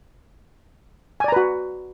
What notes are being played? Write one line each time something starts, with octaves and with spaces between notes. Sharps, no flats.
F#4 B4 D5 G#5 A#5